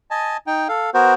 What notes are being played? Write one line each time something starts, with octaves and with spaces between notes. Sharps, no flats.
D#5 G#5 A5
D#4 G5
A4 F5
B3 F#4 A#4 C5